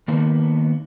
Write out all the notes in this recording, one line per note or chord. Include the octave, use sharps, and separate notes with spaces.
D#3 A#3 B3 D#4 B4